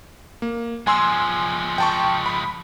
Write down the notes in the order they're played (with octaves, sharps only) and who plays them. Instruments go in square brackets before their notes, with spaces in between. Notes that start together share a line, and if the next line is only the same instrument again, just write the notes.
[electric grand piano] A#3
[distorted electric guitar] F3 G#3 [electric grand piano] G#5 C6 E6
[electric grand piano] G5 A5 C#6
B5